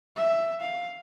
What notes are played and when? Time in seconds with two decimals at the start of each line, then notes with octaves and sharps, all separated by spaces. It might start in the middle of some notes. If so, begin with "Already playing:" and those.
0.17 E5
0.61 F5